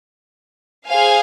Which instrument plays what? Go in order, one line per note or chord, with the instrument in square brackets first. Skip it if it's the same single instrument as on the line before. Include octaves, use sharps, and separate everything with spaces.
[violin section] G#4 C5 F5 G#5